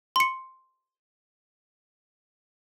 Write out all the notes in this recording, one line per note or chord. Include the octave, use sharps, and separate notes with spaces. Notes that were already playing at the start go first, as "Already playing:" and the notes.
C6 C#7